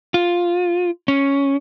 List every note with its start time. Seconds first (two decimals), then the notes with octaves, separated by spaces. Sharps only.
0.14 F4
1.08 C#4